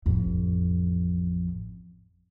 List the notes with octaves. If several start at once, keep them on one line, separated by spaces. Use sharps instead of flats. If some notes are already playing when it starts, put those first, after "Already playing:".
A1 F2